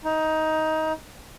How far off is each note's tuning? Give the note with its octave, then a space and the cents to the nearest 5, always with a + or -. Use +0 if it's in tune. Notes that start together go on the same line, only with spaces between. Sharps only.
D#4 +15